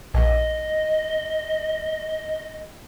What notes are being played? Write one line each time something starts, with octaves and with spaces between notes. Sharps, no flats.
A#1 D#5